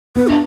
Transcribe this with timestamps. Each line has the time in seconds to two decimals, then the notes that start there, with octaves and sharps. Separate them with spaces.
0.16 B3 B4
0.27 D4